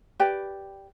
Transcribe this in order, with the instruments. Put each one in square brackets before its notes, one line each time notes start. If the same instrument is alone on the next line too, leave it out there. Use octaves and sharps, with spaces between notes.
[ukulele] G4 B4 D5 G5